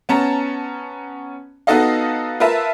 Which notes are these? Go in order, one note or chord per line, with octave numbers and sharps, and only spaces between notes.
B3 C#4 A5 A#5
B3 D#4 F#4 A4 D#5 F5
F4 A#4 B4 E5 A5